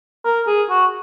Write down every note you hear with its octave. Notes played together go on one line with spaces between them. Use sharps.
A#4
G#4
F#4